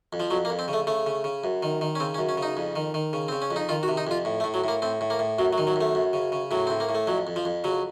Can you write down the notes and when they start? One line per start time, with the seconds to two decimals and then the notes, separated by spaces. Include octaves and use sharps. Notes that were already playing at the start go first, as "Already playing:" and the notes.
0.13 F2
0.20 F3
0.31 F2 F#3
0.45 A#3
0.50 F2
0.59 C4
0.68 C#3
0.73 A3
0.87 C#3 A3
1.06 C#3
1.24 C#3
1.44 F#2
1.63 D#3
1.81 D#3
1.95 C#4
2.00 C#3 C4
2.14 C#4
2.18 F#2
2.29 C#4
2.37 C#3
2.42 D#4
2.57 F2
2.76 D#3
2.94 D#3
3.13 C#3
3.28 C#3 C4
3.42 C#4
3.51 F2
3.56 D#4
3.69 D#3 F4
3.83 F#4
3.88 C3
3.97 D#4
4.07 F2 F4
4.25 A2
4.40 A3
4.44 A2
4.54 F#3
4.64 A2 A#3
4.82 A2 C4
5.01 A2
5.10 A#3
5.19 A2
5.39 F#2 F#3
5.53 F#3
5.58 D#3
5.67 F#3
5.76 F#2 A3
5.95 F#2
6.13 C#3
6.32 C#3
6.51 A2 F#3
6.67 A2 C4
6.80 A#3
6.89 A2
6.95 A3
7.07 F2 F#3
7.27 F2
7.36 F3
7.45 F2
7.64 C#3 F#3